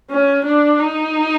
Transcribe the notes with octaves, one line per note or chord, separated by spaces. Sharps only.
C#4
D4
D#4